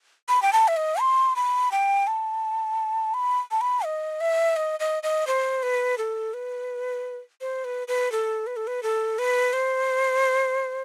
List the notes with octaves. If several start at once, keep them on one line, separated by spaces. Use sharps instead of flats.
B5
G5
A5
E5
D#5
C6
B5
G5
A5
B5
A5
B5
D#5
E5
D#5
D#5
D#5
C5
B4
A4
B4
C5
B4
B4
A4
B4
A4
B4
A4
B4
C5